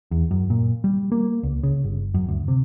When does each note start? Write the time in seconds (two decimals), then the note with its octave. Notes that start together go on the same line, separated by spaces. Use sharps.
0.11 E2
0.31 F#2
0.50 A#2
0.84 G3
1.12 A#3
1.43 C#2
1.63 C#3
1.84 G1
2.14 F#2
2.28 D2
2.48 C3